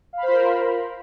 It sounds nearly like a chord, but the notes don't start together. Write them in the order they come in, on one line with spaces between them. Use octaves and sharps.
F5 B5 C5 F4 A#4